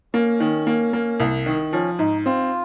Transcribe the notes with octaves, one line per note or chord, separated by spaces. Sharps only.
A#3 C#4
D#3
A#3
A#3
C2
D#3
F3 C#4
G#2 D#4
C4 F4